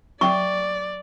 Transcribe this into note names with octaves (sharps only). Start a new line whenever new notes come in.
F#3 D5 G5 C#6